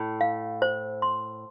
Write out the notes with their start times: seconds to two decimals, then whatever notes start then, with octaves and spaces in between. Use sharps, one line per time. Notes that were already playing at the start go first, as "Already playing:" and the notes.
Already playing: A2
0.21 F5
0.62 C5
1.02 C6